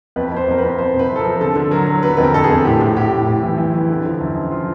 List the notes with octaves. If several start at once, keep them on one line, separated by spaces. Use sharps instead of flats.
F2 B4
F2 C5
F2 A#4
F2 B4
F2 C5
C3
B4
F3
A4
A#4
F3
D3 A4
D3
F#3 A#4
F#3
D3 B4
F2 B4
A#4
F2 A4
G#4
F2
A2 G4
A2
A2 G4
A2
A2
E3
E3
E3
D3
F3
F#2
F3
F3 F4